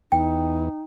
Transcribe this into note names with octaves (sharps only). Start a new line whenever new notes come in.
E2 D#4 G5